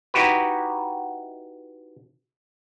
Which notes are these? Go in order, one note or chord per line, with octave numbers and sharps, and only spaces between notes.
D#4 E4 F#4 G4 B4